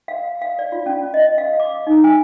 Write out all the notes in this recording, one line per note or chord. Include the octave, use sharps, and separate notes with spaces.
F5
F5
D5
F4
C#4
D#5
F5
D6
D#4
G#5